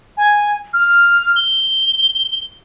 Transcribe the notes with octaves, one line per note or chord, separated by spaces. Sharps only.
G#5
F6
G7